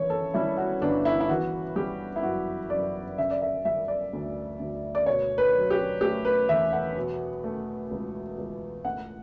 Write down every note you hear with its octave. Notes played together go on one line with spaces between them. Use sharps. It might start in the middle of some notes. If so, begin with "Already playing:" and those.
Already playing: G2 E3 C#5
A4
G3 E4
F#4
G1 D4
E4
E4
E3 F#4
G3 G4
E4
F#2 F#4
F#2 D5
C#3 E5
D5
E5
G3 E5
D5
D2
D2
D5
B2 C#5
B4
F#3
G4
A3 G4
B4
E2 E5
F#5
B2
A3
C#2
C#2
A2 F#5